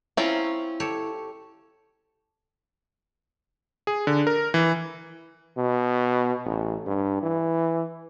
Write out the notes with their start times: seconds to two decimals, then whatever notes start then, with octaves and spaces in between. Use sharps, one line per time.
0.17 C4 C#4 E4 F4 C#5 G5 A#5
0.80 G4 A4 C#5
3.87 G#4
4.07 D3
4.27 A#4
4.54 E3
5.58 B2
6.45 A1
6.87 G2
7.23 E3